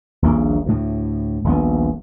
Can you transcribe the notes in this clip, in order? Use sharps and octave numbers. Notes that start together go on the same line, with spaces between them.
D#1 A#1 A#3
D2 A2
D#1 A#1 B3